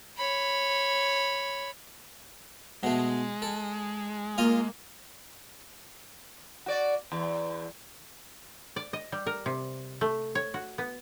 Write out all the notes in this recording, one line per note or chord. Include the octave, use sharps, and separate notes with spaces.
C#5 B5
B2 G#3 A3
A4
A#3 F4 D#5 F5
F#4 D5
E2
D5
D#5
G3
A#4
C3
A3
C#5
F#4
B3